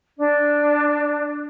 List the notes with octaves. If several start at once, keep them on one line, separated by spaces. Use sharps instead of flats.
D4